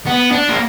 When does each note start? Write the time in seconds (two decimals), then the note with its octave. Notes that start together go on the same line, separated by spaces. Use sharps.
0.07 B3
0.31 D4
0.49 A#3